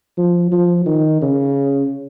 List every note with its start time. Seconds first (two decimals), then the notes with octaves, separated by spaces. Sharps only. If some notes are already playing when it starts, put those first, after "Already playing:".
0.17 F3
0.52 F3
0.86 D#3
1.21 C#3